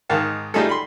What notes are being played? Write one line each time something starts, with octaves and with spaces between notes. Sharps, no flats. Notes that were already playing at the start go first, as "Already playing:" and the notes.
G#2 D#3 F5 A5
G3 A3 D#4 F4 G#4 A4
B5 C6